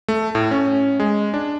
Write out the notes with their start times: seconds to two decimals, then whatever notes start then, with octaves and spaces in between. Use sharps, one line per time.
0.08 A3
0.35 A2
0.51 C#4
1.00 G#3
1.34 D4